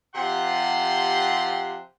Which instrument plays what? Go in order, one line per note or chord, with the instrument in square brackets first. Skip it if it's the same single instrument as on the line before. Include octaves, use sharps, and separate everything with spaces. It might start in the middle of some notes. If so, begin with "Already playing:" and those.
[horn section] C3 F3 G4 F#5 C6